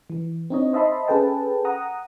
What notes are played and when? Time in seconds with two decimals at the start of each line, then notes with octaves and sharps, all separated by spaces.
0.10 E3
0.50 C4 D4 D#4 C#5 D#5
0.73 C5 D#5 E5 A5 B5 C6
1.08 C#4 G#4 A4 B4 G5 A5
1.65 F#5 A#5 D#6